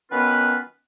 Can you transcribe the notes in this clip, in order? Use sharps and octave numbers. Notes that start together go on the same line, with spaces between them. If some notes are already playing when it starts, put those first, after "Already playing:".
D#3 F#3 B3 C#4 F4 B4